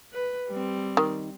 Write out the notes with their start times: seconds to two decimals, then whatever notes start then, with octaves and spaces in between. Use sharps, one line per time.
0.14 B4
0.49 G3 C4
0.97 D#3